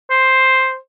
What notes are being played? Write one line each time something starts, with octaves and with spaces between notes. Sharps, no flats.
C5